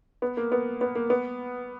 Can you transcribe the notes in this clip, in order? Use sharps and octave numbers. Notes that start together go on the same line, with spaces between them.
B3
A#3
B3
B3
A#3
B3